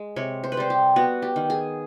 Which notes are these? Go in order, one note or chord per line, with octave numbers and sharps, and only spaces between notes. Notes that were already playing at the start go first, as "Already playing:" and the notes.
Already playing: G#3
C3 C#5
C5
B4
G3 C5
G4
B3 F#4
G4
D#3
G#4